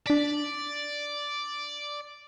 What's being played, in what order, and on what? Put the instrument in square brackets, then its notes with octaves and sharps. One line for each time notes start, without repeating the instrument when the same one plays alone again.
[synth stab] D4 B6 [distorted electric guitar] D5